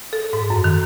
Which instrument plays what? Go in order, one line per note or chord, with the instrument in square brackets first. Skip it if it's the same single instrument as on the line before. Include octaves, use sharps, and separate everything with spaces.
[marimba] A4
G#2
F#2
D#3